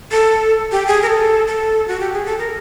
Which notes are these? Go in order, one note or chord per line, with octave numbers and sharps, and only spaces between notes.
A4
G4
G#4
A#4
A4
A4
F#4
G4
G#4
A4
A#4